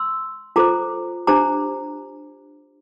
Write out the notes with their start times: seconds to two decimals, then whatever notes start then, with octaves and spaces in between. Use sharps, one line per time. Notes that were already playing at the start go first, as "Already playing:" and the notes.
Already playing: C6 E6
0.56 F4 A4 C5 A#5 D6
1.27 D4 G4 C5 A#5 D6